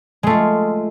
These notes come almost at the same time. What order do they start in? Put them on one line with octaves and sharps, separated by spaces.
G#3 A3 F4